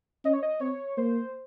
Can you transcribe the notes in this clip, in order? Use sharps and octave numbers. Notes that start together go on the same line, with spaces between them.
C#4 D#5
C#5
D#5
C4 C#5
A#3 C5